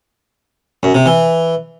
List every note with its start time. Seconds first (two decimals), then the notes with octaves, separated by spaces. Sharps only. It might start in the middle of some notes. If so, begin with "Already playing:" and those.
0.83 F#2
0.95 C3
1.06 E3